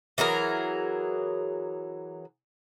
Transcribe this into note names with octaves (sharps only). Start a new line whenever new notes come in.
E3 F#3 G#4 A#4